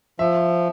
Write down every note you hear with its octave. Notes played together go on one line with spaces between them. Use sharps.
F3 E5